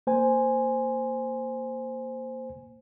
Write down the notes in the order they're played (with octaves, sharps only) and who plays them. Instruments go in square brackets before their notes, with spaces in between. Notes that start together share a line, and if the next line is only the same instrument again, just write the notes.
[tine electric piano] A#3 C5 G#5